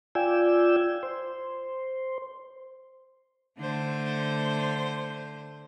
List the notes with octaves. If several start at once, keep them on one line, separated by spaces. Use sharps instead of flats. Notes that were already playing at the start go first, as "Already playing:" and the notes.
F4 D5 G5 G#5 E6
C5
D3 A3 C5